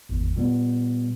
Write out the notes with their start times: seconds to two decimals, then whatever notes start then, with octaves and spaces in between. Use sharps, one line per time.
0.09 G#1 E2
0.36 A#2 G3 B3